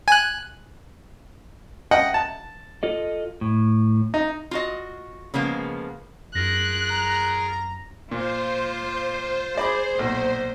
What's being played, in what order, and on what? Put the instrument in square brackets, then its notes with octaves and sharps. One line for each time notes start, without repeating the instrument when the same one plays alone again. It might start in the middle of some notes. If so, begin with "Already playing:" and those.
[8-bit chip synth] G#5 F#6
[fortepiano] D#5 F#5 G5
A5
[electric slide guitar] F4 A4 D#5
A2
[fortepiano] D#4
[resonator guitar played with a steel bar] F4 F#4 D#5
C#3 F3 G#3 A#3 B3
[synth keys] F#2 A#6 [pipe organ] F4 G#4 A#4 [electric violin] F#6
[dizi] A#5
[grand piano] A#2 [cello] F4 [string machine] C5
[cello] G#4 [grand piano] D5 B5 D6
[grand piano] B1 [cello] A#2